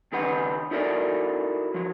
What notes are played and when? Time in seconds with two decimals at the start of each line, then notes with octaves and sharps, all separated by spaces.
0.12 C#2 D#3 G4 B4 F#5
0.71 D#4 E4 F#4 A4 A#4 D5
1.74 F3 F#4